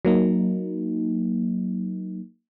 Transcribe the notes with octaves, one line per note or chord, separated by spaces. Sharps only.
F#3 A#3 D#4